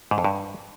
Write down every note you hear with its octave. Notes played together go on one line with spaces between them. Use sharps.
G#2
F2
G2